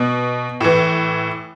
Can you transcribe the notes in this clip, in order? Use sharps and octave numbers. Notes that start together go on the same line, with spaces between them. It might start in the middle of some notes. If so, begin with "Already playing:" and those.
Already playing: B2
A2 E3